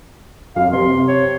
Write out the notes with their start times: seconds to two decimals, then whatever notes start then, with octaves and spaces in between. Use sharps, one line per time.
0.56 F#2 F5
0.73 C3 C6
1.07 C#5